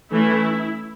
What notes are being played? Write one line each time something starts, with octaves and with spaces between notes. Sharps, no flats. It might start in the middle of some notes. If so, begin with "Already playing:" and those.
E3 A3 C#4 E4